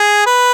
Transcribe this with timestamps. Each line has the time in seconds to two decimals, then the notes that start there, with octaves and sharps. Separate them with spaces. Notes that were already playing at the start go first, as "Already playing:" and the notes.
Already playing: G#4
0.26 B4